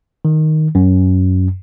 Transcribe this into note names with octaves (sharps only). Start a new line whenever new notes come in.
D#3
F#2